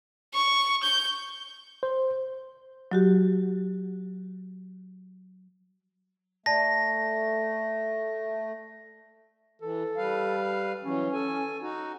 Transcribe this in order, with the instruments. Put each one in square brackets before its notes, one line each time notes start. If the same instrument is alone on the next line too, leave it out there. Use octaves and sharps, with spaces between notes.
[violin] C#6
G6
[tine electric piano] C5
[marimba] F#3 F#4 G4
[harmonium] A3 [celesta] D5 A5 [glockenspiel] A#6
[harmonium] E3 [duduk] A4
[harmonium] G3 B4 F5
[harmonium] E3 F#3 [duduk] C#4
[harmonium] A4 G#5
D#4 F#4